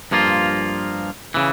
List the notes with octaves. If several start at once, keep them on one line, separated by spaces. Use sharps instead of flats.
G2 F3 A#3 F4
C#3 E3